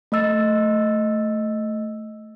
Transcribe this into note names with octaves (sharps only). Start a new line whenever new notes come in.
A3 D#5 E6 A6